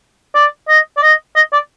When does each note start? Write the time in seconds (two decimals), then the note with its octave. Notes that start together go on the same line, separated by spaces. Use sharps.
0.35 D5
0.68 D#5
0.97 D5
1.02 D#5
1.36 D#5
1.53 D5